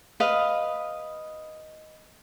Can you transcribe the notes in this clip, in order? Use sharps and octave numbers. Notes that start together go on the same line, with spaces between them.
B4 D#5 F5